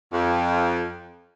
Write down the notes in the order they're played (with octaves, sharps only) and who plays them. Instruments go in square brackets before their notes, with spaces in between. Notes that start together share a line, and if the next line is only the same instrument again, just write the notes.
[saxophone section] F2